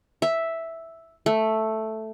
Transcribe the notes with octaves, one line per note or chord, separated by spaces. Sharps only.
E5
A3